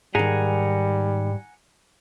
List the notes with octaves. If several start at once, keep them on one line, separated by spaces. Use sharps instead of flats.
G#2 D#3 G3 G#4 F#5 G#5 A#5